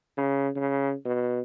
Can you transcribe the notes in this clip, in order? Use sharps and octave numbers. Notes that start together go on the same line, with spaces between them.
C#3
C#3
B2